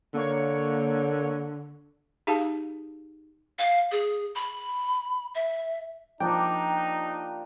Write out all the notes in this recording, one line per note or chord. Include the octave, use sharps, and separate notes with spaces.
D3 A#3 C#5
D#4 G4 G#4 F5 A5
F5
G#4
B5
E5
F3 A#3 D4 D#4 G4 G5